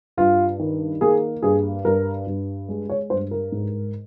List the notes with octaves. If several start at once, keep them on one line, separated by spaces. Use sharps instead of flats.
G2 F4
D#3
A#3 G#4
G2 G#4
G2 A#4
G2
G#3
C#5
G2 C5
A#4
G#2